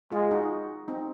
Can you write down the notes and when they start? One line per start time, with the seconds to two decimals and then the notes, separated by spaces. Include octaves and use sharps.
0.12 G#3 F4 G#4
0.31 D#4 F#4
0.88 C4 D#4